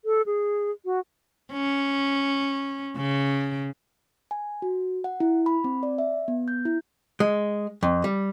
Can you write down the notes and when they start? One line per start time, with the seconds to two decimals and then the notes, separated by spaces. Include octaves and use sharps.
0.05 A4
0.26 G#4
0.85 F#4
1.53 C#4
2.97 C#3
4.31 G#5
4.62 F#4
5.04 F#5
5.20 E4
5.46 B5
5.64 C4
5.83 D5
5.98 E5
6.28 B3
6.48 G6
6.65 E4
7.20 G#3
7.83 F2
8.04 G3